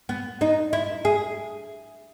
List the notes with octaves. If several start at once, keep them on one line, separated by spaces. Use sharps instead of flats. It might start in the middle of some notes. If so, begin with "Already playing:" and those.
B3
D#4
E4
G#4